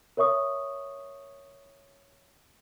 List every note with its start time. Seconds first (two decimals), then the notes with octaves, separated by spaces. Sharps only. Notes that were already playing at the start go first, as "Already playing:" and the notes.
0.17 A#4 C#5 E5 C#6 D#6